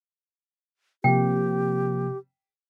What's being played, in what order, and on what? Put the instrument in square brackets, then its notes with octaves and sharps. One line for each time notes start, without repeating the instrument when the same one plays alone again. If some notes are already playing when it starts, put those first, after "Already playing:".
[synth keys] C3 [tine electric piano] F3 A#3 [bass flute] G4 [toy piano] G5